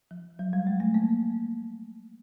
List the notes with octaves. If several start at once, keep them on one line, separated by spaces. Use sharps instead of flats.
F3
F#3
G3
G#3
A3
A#3